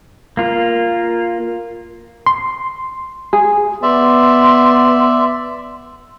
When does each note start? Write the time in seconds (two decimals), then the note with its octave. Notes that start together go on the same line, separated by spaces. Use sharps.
0.37 A#3 F4
2.26 C6
3.33 G#4
3.83 B3 D5 E5 C6